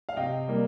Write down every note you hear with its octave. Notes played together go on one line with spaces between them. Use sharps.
F5
C3 D#5 G5
G3 A#3